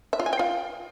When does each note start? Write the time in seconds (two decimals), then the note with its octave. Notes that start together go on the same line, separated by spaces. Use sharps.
0.13 E5
0.20 F4
0.26 G#5
0.33 G5
0.39 F4